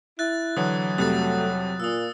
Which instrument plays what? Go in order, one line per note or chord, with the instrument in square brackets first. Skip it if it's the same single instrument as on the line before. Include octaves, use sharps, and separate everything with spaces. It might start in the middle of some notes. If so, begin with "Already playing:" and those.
[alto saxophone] E4 [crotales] F#6 A6
[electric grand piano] D3 E3 [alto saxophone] F#3 [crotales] D#6
[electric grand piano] F2 C3 G3 [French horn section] A3 F#4 [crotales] D#6 F#6 A6
[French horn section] A#2 [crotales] D#6 E6